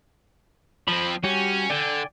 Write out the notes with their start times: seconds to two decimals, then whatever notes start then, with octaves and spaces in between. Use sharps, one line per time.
0.88 F3 C4 B5
1.23 G3 C#4 F#4 G4
1.70 D3 D5 G5 G#5